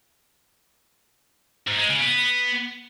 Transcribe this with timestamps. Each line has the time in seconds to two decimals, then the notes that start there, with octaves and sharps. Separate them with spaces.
1.68 G#2
1.79 G#3
1.90 C#3
2.01 B3